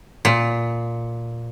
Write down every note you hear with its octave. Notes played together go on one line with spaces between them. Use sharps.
A#2